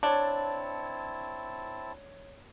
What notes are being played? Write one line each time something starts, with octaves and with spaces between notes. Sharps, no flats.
C4 D4 E4 C#5 A5